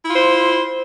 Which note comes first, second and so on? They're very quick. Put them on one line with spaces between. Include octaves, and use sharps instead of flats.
E4 F4 C5